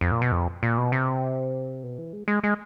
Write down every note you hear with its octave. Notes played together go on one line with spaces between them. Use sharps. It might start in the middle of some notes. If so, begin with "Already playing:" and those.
F2
A#2
B2
F2
A#2
B2
C3
B2
E3
G#3
G#3
G#3